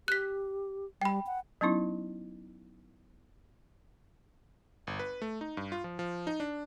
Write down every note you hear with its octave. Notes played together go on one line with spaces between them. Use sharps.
G4 F#6 B6
G3 G5 B5
F#5
F#3 B3 C#4 D#4 E4
G1
B4
A3
D#4
G2
F4
F3
F3
D#4
D4